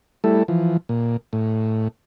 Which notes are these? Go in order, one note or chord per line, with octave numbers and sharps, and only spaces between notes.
G3 A3 E4 A4
E3 F3
A#2
A2